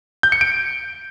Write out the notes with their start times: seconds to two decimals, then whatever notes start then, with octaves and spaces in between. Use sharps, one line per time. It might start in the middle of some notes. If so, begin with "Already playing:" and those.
0.23 G6
0.32 C#7
0.41 D7